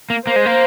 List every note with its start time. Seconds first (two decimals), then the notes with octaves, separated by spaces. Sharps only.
0.10 A#3
0.27 A#3 C5
0.36 G#3
0.46 A#3